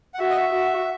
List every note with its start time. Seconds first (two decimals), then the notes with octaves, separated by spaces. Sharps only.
0.14 F#5
0.19 F#4 E5
0.30 D#5
0.37 E5
0.53 F#4